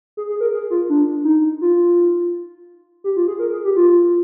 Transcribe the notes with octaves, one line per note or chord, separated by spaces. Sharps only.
G#4
G#4
A#4
G#4
F4
D4
D#4
F4
G4
F4
G#4
A#4
G#4
G4
F4